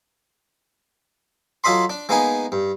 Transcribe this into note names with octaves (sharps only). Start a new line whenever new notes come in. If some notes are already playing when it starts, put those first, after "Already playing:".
F#3 F4 A4 D#5 B5 C6
D4
G#3 A#3 B3 D#4 D#5 G#5
G2